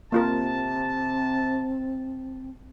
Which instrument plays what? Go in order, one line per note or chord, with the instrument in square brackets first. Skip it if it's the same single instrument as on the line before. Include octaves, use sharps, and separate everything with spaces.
[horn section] C3 A5 [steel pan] A#3 F4 A#4 [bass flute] C4